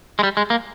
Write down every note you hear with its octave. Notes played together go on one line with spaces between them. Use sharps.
G#3
G3
G#3
A#3